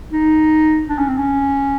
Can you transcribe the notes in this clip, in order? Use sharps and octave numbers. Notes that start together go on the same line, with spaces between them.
D#4
D4
C#4
C4
C#4